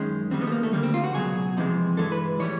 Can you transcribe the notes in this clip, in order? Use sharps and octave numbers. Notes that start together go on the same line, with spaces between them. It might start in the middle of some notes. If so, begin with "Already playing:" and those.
Already playing: F#2 D#3 G#3 C#4
D#2 D#3 G3 C4
B3
A3
A#3
A3
D2 D3 G3 A#3
C4
F4
F#4
C#2 B2 F#3 G#4
F2 C3 E3 G#3
G2 E3 G#3 A4
B4
A2 E3 G3 C#5